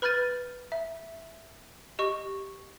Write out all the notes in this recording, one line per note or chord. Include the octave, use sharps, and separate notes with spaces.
B4 B5 F6 G6 A6 D#7
E5
G4 D#5 C#6